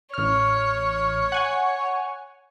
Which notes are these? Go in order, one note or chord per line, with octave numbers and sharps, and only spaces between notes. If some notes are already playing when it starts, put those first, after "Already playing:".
A1 C#5 F6
F#5 G#5 C#6